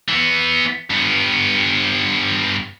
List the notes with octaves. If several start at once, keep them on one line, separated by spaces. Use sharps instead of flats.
E3 B3
G2 B3